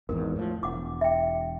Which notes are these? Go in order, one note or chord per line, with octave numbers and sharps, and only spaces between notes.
G#1 E2 G#2 A#4
A2 F3
E1 F#5 D6
E5 G5